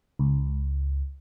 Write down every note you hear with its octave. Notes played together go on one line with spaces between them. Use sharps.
C#2